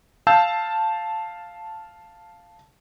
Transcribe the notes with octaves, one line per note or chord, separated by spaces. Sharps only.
F5 A5 E6 G6